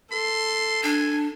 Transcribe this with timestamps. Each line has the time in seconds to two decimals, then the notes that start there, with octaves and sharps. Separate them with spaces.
0.12 A4 C6
0.83 D4 G#5